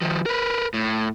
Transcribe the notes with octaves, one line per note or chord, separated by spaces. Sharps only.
D#3 F3
A#4 B4
A2